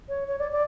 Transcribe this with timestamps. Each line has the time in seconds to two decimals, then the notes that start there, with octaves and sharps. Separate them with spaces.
0.08 C#5
0.27 C#5
0.38 D5
0.51 D5